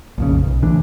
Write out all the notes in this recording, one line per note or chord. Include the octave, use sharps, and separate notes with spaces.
A#1 F2 C#3
B1
D#1 D2 E3 D4